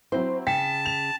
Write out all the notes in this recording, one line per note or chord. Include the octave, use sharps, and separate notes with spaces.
F#3 C4 E4 C5
C#3 G5 A5 B6
F7